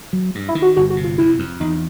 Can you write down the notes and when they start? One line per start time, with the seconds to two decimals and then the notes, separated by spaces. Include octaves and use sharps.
0.13 F#3
0.35 G2
0.48 E4
0.55 D#3
0.62 F#4
0.76 G1 F#4
0.90 F#4
0.97 C3
1.04 F4
1.18 F2 E4
1.39 F2
1.60 E2 D#4